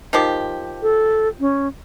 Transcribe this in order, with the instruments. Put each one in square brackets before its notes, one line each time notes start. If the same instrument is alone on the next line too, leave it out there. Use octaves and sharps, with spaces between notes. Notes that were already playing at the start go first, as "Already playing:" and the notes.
[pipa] D#3 F3 G4
[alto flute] A4
C#4